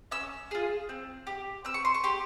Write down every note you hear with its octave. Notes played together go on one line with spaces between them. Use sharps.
C#4 E6
F4 G#4
C4
G4
C4 E6
C#6
C6
C#6
G4 C6